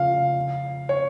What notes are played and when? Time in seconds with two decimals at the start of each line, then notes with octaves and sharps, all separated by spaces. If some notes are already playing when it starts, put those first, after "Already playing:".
Already playing: C#3 F3 F5
0.89 C#5